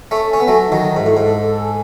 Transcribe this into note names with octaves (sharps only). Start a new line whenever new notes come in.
A3 C#4 A4
C#4 G#5
B3
F#3 A3 A4
D#4
D#3 F#3
E5
G#2
A2 A4
G#2 A4
A4
G#5